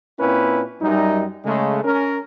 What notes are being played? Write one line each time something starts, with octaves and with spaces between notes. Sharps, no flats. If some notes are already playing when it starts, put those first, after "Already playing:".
A#2 A#3 C4 C#4 E4 B4
F#2 G3 D#4
C#3 G#3 A3
C#4 A#4